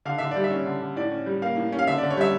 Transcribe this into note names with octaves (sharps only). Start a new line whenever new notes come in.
D3 F5
D3 E5
G3 D5
E5
C#4
D3
D3
A2 D5
C#4
G3
A#3 F5
A2
C#4
F5
D3 E5
D3 D5
C#5
G3 E5